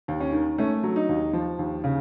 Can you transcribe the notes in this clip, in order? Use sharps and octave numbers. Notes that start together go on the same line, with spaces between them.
D#2
C#4
D#3
A3 C#4
F#3
D#4
D#2
F3
D#2
C#3